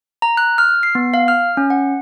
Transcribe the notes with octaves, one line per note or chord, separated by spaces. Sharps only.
A#5
F#6
F6
C7
B3
F5
F6
C#4
F#5